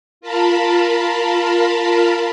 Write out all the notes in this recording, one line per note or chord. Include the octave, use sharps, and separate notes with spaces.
F4 A#4 A5 B5